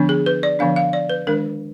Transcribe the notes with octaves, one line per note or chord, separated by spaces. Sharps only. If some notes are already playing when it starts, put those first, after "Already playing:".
Already playing: D3 F3 B3 D4
G#4
B4
D5
D3 F3 B3 D4 F5
F5
D5
B4
D#3 G#3 D4 A#4